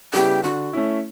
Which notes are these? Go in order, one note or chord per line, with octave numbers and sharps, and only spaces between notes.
C#3 G3 B3 E4 G4
D3 F#4
A3 C#4 E4